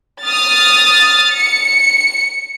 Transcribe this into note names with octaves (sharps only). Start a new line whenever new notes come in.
D#6 F6 A6
C#7